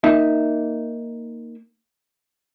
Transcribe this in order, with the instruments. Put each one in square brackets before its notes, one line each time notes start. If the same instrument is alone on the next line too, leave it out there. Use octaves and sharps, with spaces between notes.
[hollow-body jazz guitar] A#3 D#4 E5